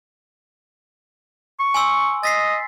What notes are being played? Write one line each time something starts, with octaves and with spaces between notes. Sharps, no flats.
C#6
G#5 C6 E6
D#5 A6 B6 C7